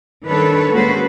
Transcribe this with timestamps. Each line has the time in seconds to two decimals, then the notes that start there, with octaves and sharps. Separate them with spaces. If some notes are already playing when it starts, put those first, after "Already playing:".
0.25 D#3 G3 D4 A4 B4 C#5
0.71 G#3 A#3 C#4 F#4 B4 C5